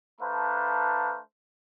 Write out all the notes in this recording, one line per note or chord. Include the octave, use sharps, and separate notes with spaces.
A3 D4 B4 C5 F5 A#5